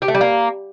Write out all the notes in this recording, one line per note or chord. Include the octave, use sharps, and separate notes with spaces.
G4
A3
G3
A#3